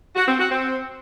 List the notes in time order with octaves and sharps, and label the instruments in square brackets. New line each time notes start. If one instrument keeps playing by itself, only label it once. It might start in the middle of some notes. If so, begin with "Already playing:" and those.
[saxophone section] F#4
C4
F#4
C4